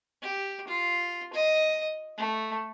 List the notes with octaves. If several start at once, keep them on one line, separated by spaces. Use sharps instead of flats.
G4
F4
D#5
A3